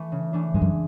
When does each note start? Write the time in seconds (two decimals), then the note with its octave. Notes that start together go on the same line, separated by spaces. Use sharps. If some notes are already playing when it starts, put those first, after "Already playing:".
Already playing: E3 A3
0.12 C#3
0.33 E3 A3 D4
0.54 G2 G#3
0.62 F#2